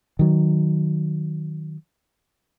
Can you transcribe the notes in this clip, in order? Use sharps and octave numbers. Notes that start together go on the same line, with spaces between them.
D#3 F#3